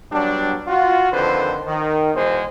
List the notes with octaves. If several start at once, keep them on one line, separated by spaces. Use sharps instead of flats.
F#3 G3 B3 D4
F4 F#4
F2 D3 D#3 B4 C5
D#3
E2 B2 G#3 C5